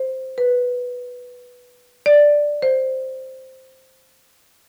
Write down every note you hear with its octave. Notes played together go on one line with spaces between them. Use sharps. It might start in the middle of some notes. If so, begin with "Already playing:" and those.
Already playing: C5
B4
D5
C5